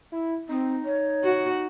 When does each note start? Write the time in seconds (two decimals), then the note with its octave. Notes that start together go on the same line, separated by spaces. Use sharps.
0.12 E4
0.49 C4 D#4
0.85 C#5
1.24 F#4